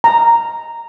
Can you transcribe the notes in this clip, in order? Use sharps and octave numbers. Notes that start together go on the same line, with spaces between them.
A#5